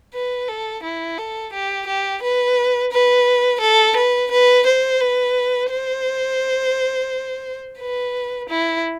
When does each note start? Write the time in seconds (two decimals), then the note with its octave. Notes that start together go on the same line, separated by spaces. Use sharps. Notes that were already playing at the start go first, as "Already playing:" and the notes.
0.13 B4
0.48 A4
0.83 E4
1.18 A4
1.53 G4
1.87 G4
2.23 B4
2.92 B4
3.61 A4
3.96 B4
4.31 B4
4.66 C5
5.01 B4
5.70 C5
7.80 B4
8.49 E4